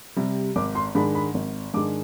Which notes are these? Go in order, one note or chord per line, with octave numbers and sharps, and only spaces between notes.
C3 G3
G#1 D6
C6
G#2 D#3 G#3 D4 B5
B5
G#1
G#2 D#3 G#3 D4 D6